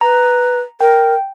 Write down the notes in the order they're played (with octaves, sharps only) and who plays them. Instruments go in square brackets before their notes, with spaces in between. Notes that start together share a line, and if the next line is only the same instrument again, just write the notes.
[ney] B4 [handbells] A#5
[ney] A#4 [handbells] G5